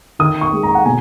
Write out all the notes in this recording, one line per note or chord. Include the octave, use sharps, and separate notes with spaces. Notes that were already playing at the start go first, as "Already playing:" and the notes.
D#3 D#6
C#6
G#3
A#5
F#5
B2 G#5